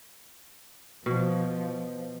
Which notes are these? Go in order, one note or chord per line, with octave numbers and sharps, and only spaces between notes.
B2 F3